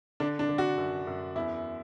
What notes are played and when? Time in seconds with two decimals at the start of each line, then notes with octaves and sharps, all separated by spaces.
0.20 D3 D4
0.39 D4
0.49 D3
0.58 F#4
0.78 F#2
1.07 F#2
1.35 E2 E4